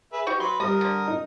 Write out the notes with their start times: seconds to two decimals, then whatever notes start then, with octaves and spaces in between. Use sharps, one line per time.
0.13 G#4 B4 E5
0.27 D#4 F#4 G4 C#6
0.40 F#3 B4 B5 C6
0.60 G3 A#4 D#5 D#6
0.81 D3
1.07 D#4